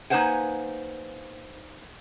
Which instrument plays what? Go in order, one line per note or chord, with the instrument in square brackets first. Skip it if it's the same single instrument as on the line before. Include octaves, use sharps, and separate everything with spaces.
[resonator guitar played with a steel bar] A#3 D#4 B4 C5 F#5 G#5